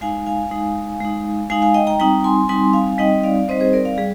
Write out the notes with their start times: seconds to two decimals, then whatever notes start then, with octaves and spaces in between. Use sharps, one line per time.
0.01 G#3 D#4 F5 G#5
0.26 F5 G#5
0.51 G#3 D#4
1.00 G#3 D#4
1.50 G#3 D#4 F5 G#5
1.62 F5 G#5
1.74 D#5 G5
1.87 G5 A#5
1.99 G3 C4 D#4 G5 A#5
2.24 G#5 C6
2.49 G3 C4 D#4 G#5 C6
2.73 F5 G#5
2.98 G3 C4 D#4 D#5 G5
3.24 D5 F5
3.48 G3 C4 D#4 C5 D#5
3.60 G#4 C5
3.73 A#4 D5
3.85 D5 F5
3.98 G3 G#4